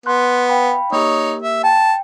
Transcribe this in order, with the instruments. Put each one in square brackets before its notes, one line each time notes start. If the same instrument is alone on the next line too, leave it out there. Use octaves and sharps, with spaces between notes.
[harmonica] B3 [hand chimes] C6 F#6
[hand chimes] F5 G5 B5
[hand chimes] A#3 G4 [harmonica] D#4 C#5
[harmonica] E5
[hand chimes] G5 [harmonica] A5